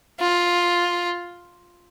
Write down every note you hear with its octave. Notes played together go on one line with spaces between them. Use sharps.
F4